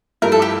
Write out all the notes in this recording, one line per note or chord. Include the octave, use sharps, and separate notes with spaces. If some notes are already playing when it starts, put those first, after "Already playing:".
G2 F3 A3 E4 A#4
A4
G4